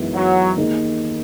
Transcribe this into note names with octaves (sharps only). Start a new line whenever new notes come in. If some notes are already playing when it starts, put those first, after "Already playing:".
Already playing: F#2 E3 G#3 B3 D#4
F#3
D#2 D#3 A#3 D#4 G#4